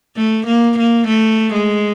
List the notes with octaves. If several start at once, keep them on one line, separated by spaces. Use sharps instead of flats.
A3
A#3
A#3
A3
G#3